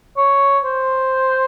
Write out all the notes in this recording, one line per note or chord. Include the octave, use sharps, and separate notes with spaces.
C#5
C5